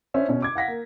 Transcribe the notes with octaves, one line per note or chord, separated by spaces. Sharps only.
C#4 D4 C5 E5
B2 C#4
D6 G#6
F5 F#5 A#6 B6
A#3